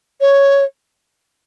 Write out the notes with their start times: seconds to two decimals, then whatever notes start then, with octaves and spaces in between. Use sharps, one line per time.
0.21 C#5